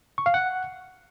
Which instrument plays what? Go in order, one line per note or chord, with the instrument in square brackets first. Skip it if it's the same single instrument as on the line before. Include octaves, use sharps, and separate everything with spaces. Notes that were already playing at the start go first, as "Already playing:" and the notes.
[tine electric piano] C#6
F5
F#5